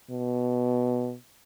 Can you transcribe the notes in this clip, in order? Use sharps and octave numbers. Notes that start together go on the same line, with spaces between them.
B2